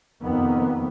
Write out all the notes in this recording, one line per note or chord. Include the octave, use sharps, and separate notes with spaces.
F2 C3 D#3 A#3 B3